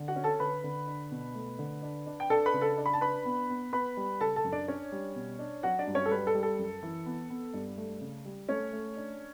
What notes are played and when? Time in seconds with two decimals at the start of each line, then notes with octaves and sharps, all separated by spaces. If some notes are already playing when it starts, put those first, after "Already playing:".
Already playing: D3
0.08 F#4 F#5
0.16 C#4
0.24 A4 A5
0.40 D3 B4 B5
0.64 D3
0.87 D4
1.11 B2
1.34 A3
1.59 D3
1.82 D4
2.07 D4
2.20 G5
2.30 D4 A4 A5
2.46 B4 B5
2.54 C#3
2.61 A4 A5
2.77 D4
2.86 B5
2.93 A5
3.01 D4 B4 B5
3.25 B3
3.50 B3
3.73 B3 B4 B5
3.97 G3
4.21 C#3 A4 A5
4.36 A4 A5
4.44 F#2
4.52 D4 D5
4.68 C#4 D4 C#5
4.92 G3
5.16 B2
5.39 D4
5.63 F#3 F#4 F#5
5.79 D4 D5
5.87 G2
5.95 C#4 C#5
6.06 A4
6.11 G3 B4
6.27 A4
6.34 G3
6.43 A4
6.59 F#2
6.83 E3
7.06 B3
7.30 B3
7.54 G2
7.77 A3
8.01 C#3
8.25 G3
8.49 A3 C#4 C#5
8.73 A3
8.97 D4